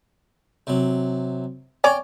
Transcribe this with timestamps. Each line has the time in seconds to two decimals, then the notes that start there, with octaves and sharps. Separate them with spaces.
0.67 C3 F#3
1.84 C#4 C#5 D5 G5 G#5